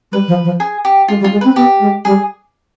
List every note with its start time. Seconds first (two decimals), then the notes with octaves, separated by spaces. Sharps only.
0.12 G3 B4
0.28 F3
0.44 F3
0.60 G#4
0.85 G4
1.08 G#3 F4
1.20 G3
1.24 F4
1.33 G#3
1.41 C4 B4
1.56 B3 G4
1.80 G#3
2.05 G3 G#4